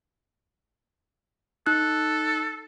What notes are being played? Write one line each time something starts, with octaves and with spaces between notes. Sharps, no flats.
D#4 A4 F#6